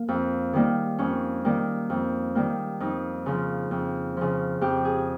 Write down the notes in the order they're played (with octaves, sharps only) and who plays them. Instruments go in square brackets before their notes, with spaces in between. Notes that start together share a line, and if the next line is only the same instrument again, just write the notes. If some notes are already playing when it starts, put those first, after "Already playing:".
Already playing: [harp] A#3
F2
D#3 G3 A#3
F2 C#4
D#3 G3 A#3
F2
D#3 G3 A#3
F2 D#4
C#3 F3
F2
C#3 F3
F2 G4
G#4